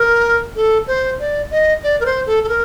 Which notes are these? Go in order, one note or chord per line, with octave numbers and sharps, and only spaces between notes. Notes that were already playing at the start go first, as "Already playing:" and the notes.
Already playing: A#4
A4
C5
D5
D#5
D5
A#4
C5
A4
A4
A#4